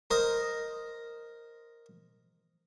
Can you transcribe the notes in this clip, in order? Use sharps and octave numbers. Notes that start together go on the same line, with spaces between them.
A#4 C5 D#5